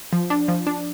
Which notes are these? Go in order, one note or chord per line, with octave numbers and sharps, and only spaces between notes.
F3
D4
F3
D4